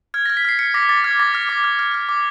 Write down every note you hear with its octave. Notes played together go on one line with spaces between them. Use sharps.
F6 G#6
A#6
F6
B6
F6 C7
F6 C#7
D6 A#6
D6 A6
F6 G#6
D6 A#6
F6 A#6
D6 A#6
F6
F6
F6
D6